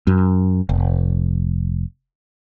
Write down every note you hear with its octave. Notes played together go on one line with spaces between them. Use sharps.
F#2
F1